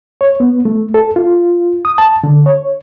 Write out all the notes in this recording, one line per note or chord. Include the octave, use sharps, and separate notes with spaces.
C#5
B3
A3
A4
F4
D#6
A5
D3
C#5